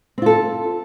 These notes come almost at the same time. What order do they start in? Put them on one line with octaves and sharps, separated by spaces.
C4 F4 A4